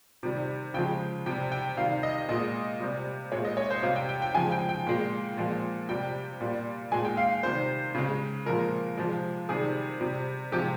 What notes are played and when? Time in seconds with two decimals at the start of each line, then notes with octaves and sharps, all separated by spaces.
0.23 C3 D#3 G3
0.74 C#3 F3 G#3 G5
1.26 C3 G3 G5
1.52 G5
1.77 C3 D#3 G3 F5
2.03 D#5
2.29 A#2 G#3 D#5
2.80 C3 G3
3.32 A#2 G#3 C#5
3.45 D#5
3.57 C#5
3.70 C5
3.83 C3 F5
3.86 G3
3.96 G5
4.09 G5
4.22 G5
4.34 C#3 F3 G#3 G#5
4.52 G5
4.69 G5
4.87 A#2 G#3
5.37 A#2 F3 G#3
5.89 C3 G3 G5
6.41 A#2 G3
6.92 A#2 G#3 G#5
7.05 G5
7.17 F5
7.43 C3 D#3 G3 C5
7.95 C#3 G#3
8.46 A#2 F3 G#3 A#4
8.97 C3 F3 G#3
9.49 C3 D#3 G3 G#4
10.00 C3 G3
10.52 C3 F3 G#3 G4